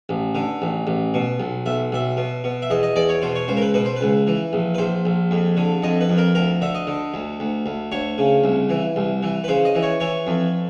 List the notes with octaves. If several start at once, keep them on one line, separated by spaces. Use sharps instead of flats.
A1
D3
A1
A1
B2
B1
B1 E5
B1 E5
B2
B2
E5
E2 D#5
D#5
E2 D5
C#5
B2 C5
C#5
C#2 C5
A#4
B4
B2 B4
C5
C#2 B4
E3
A#1
B4
A#1 C5
A#1
F2
D3
F2 D#5
B4
F2
A#4
D2 A#4
D3 E5
D#5
D3
D2
D2
D2
D2 C#5
C#3
C2
E3
C2
E3
B4
C#3 C5
D#5
E3
C#5
E3 C#5
F2